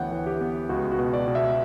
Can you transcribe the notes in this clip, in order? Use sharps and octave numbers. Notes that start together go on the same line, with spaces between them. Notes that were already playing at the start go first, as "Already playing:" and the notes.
Already playing: D2 E3 B3 C#5 F#5 G5
E3
G4
B3
C#2 F#4
F#4
B2
D5
B2
E5